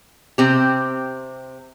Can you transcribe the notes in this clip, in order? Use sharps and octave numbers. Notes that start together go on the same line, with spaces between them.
C3 C4 G4